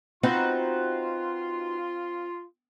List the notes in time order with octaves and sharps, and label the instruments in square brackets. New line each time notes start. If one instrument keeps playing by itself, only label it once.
[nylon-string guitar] C4 [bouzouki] D#4 F#4 B4 [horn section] F4 C6